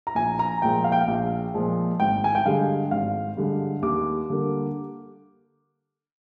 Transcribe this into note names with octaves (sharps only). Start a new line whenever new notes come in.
A#5
A#1 G#5
A#5
A#2 F3 G#3 G5
F5
G5
F5
A#1
A#2 F3 G#3
G#1 G5
G#5
G5
G2 D3 G#3 F5
G#1 F5
G2 D3 G#3
D#2 D6
D3 G3 A#3